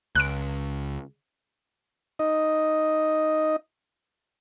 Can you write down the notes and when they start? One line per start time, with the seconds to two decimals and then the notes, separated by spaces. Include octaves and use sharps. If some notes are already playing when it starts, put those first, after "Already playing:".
0.15 C#2 F#6 D7
2.19 D#4 D#5